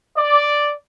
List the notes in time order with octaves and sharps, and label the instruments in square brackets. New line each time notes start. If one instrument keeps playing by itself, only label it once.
[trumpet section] D5